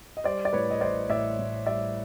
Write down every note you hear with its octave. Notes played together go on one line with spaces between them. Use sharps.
D#5
G3 C5 D5
D5
A2 B4 C#5
D#5
A1 C5 D5
A2 D5 E5
A2
G3 D5 E5